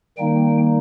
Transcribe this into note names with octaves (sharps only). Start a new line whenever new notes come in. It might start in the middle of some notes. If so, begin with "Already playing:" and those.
D#3 G3 A#3 D#4 G5